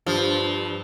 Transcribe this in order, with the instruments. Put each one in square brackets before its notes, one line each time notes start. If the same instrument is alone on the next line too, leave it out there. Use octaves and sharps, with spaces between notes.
[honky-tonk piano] G2 [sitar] F3